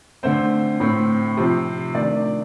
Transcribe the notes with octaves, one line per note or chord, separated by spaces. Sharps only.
D3 A3 C4 C5
A2 A3 C4
C3 F3 C4
D#3 A3 D4 D5